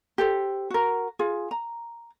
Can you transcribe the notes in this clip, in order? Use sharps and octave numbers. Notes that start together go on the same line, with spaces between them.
G4 A4 C5
F#4 A#4
F4 G#4
A#5